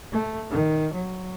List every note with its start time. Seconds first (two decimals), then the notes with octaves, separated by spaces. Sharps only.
0.12 A3
0.50 D#3
0.93 F#3